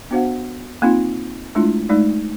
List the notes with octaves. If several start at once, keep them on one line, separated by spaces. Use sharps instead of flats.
B3 D4 F#4 C5 F5 F#5
A#3 C4 D#4 F4
G#3 A3 D4 E4 F4
G#3 A3 D#4 D5